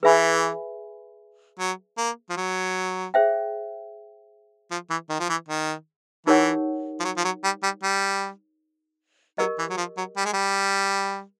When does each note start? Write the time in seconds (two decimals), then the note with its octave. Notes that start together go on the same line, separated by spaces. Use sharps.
0.02 E3 G#4 B4 E5 G#5 B5
1.59 F#3
1.97 A#3
2.29 F3
2.37 F#3
3.14 G#4 C5 E5 G5
4.71 F3
4.90 E3
5.09 D#3
5.19 F3
5.29 E3
5.49 D#3
6.27 E3 D#4 G4 A#4 C#5 F#5
7.00 F3
7.04 F#3
7.17 F3
7.24 F#3
7.44 G3
7.63 G3
7.83 G3
9.38 F#3 G4 A#4 D#5
9.58 E3
9.69 F#3
9.77 F3
9.97 F#3
10.17 G3
10.25 G#3
10.33 G3